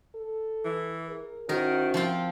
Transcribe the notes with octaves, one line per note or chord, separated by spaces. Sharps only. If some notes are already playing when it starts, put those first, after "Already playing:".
A4
E3
G#4 A#4
D#3 C#4 E4 F#4 A#4 C5
F3 C4 F4